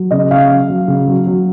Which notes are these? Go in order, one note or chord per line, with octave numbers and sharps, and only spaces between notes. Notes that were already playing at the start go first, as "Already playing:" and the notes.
Already playing: F#3
C#3 D#5
C#3 F5
F#3
F#3
C#3
F#3
F#3